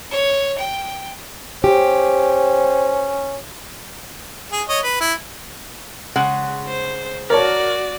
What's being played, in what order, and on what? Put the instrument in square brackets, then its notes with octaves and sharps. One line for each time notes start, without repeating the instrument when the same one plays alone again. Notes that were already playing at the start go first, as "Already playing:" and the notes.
[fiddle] C#5
G5
[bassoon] C#4 [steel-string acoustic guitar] G4 [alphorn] C5
[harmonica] G#4
C#5 D#5
B4
E4
[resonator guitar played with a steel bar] C#3 G#3 F#5
[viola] C5
[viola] F#4 D5 [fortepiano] A#4 C#5 A5